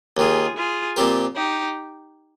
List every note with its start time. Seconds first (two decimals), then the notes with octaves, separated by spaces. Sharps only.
0.17 D#2 D#3 G#3 F4 G#4
0.56 F4 G#4
0.96 A#2 F3 C4 G4 A#4
1.36 D#4 G4